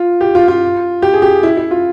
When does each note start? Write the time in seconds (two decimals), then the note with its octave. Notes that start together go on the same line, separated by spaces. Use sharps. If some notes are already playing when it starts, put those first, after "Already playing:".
Already playing: F4
0.21 G4
0.35 F4
0.48 F4
1.02 G4
1.13 G#4
1.22 G4
1.43 E4
1.57 E4
1.71 F4